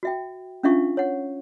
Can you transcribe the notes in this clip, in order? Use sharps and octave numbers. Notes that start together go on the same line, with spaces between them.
F#4 E5 G5
C#4 D4 F4 E5 F5 C#6
C#5 F#5